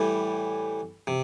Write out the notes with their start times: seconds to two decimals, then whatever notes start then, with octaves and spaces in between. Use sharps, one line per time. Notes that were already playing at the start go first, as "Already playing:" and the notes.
Already playing: A2 E3 G3
1.07 C3